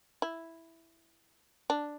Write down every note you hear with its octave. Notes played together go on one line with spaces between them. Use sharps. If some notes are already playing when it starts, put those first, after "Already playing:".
E4
D4